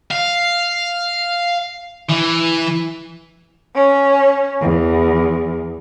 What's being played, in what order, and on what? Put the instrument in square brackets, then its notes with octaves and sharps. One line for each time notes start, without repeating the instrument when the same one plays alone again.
[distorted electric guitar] F5
E3
[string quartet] C#4
E2